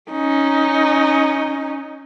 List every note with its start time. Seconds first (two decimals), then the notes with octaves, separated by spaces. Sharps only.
0.11 C#4 D#4